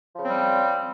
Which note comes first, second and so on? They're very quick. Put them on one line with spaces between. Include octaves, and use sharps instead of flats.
F3 C#3 C4 G3